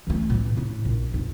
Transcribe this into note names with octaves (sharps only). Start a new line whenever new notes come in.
E3 A3
A2 E3
A2 E4
A#1
F2 D#4